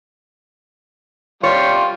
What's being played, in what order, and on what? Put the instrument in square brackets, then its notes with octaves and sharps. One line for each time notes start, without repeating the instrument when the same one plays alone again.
[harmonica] G3 F4 [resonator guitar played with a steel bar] C#5